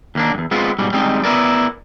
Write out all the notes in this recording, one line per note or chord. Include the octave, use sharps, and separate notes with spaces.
D#2 A#3 D4
E2 G2
G#3 B3 C4 F4
G#2 B2 G3
G3 G#3 C4 D4 D#4
B3 E4 A#4 D5